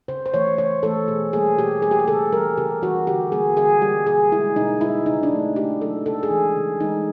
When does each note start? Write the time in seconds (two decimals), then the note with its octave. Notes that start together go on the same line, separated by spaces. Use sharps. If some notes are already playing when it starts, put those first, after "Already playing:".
0.08 C#3 C5
0.26 C5
0.34 E3 A3 C#5
0.58 C#3 C#5
0.83 E3 A3 A4
1.08 B2 G#4
1.33 A#3 G#4
1.36 G3
1.58 B2 G4
1.82 G3 A#3 G#4
1.91 G4
1.99 G#4
2.08 C#3 A4
2.32 G3 A#4
2.37 E3
2.57 C#3 G4
2.82 E3 F#4
2.86 G3
3.07 D3 G4
3.32 G3 A#3 G#4
3.57 D3 G#4
3.82 G3 G4
3.86 A#3
4.07 B2 G#4
4.32 G#3 E4
4.56 B2 D#4
4.81 G#3 E4
5.06 C#3 D#4
5.23 D4
5.31 F#3 A3
5.56 C#3 G4
5.81 F#3 A3 A4
6.05 C#3 A4
6.23 G#4
6.30 E3 G#3
6.55 C#3
6.80 E3 G#3 D#4